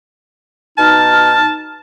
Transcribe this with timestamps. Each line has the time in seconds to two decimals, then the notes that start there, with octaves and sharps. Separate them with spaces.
0.78 B2 D#4 A5 F6